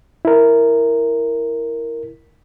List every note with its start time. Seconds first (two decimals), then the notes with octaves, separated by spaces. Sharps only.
0.25 E4 A#4